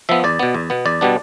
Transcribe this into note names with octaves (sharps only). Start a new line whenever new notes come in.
F3 B3 E5
E2 D5
B2 B3
E2
B2 B3
E2 D5
B2 G3 B3 D4